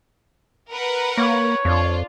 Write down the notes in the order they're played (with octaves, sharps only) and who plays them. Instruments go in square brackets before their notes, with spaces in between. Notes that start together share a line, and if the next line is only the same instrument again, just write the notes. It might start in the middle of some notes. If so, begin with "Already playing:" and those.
[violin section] A#4 B4 F#5
[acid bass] A#3 [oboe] C#5
[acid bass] F2 [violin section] D4 F4